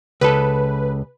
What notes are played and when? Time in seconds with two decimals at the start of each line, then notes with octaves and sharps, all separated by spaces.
0.21 C#2 A4 B4